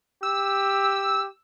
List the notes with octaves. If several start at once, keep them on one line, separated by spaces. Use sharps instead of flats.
G4 E6